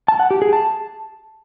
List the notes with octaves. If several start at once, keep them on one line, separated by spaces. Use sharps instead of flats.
A5
F#5
G4
G#4
A5